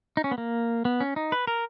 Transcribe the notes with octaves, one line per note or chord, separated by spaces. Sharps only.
D#4
C#4
B3
A#3
B3
C#4
D#4
B4
A#4